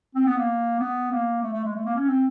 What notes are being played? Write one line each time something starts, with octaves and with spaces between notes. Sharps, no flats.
C4
B3
A#3
B3
A#3
A3
A3
G#3
A3
A#3
C#4
C4